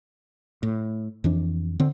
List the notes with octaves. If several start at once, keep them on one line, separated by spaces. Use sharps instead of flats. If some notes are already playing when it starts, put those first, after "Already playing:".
A2
F2 E3 D4
D3 C4